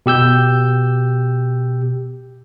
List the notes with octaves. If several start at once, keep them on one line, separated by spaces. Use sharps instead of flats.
B2 G4 E6 G6